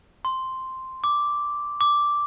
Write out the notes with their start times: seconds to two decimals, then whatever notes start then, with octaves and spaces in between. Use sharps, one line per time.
0.25 C6
1.04 D6
1.81 D6